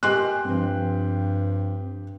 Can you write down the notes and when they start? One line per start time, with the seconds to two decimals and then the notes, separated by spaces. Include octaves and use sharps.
0.03 G4 A#4 D#5 G#5 C6 F#6
0.45 G2 F3 C4